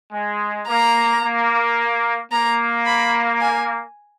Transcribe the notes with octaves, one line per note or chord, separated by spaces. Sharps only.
G#3
A#3 A#5
A#3
A#3 A#5
B5
G#5